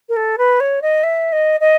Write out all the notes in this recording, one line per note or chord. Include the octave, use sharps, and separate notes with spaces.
A#4
A4
B4
C#5
D#5
E5
D#5
D#5